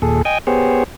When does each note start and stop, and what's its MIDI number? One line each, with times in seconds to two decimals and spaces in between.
0.02 0.22 39
0.02 0.22 46
0.02 0.22 68
0.02 0.22 69
0.25 0.38 75
0.25 0.38 79
0.25 0.38 80
0.47 0.84 59
0.47 0.84 67
0.47 0.84 68
0.47 0.84 72
0.47 0.84 73